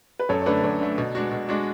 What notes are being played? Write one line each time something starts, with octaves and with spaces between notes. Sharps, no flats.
B4
F#2 A4 C#5
C#5
D3 A3 B4 D5
F#2 B4 D5
D3 A3
B2
G#3 D4 F#4
B2
G#3 D4 F#4